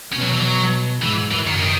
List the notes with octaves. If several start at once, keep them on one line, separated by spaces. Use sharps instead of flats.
B2 C#4
F#3
E3
F#3
G#2 E3
F#2 E3
D#3
C#3
D#3